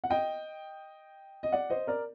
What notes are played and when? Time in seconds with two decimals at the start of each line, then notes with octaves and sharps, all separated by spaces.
0.04 F#5
0.10 D#5 G5
1.43 D#5
1.52 D5 F#5
1.70 C5 D#5
1.87 A#4 D5